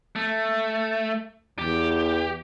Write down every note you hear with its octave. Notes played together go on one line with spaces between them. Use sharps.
A3
E2 G4